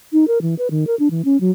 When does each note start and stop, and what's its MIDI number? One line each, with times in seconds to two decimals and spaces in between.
0.13 0.25 63
0.27 0.38 70
0.42 0.55 52
0.58 0.68 71
0.71 0.85 51
0.87 0.95 70
0.99 1.08 62
1.11 1.22 52
1.25 1.39 61
1.40 1.51 54